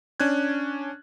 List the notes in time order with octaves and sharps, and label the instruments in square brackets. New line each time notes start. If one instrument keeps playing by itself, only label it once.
[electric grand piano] C#4 D4 F#6 G#6